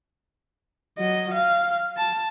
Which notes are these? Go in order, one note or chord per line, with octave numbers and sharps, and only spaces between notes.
F#3 D#5
F5
A5